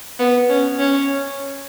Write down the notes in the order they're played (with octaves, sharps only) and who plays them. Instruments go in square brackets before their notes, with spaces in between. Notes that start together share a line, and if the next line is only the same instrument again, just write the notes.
[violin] B3
C#4
C#4